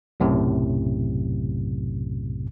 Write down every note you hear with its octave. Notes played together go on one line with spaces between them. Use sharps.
B1 F#2 A2 C3